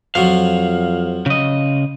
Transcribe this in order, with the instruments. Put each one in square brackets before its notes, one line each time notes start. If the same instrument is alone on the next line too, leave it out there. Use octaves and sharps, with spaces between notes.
[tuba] F2 [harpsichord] F3 F#3 [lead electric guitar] F5
[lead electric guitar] C#3 D#5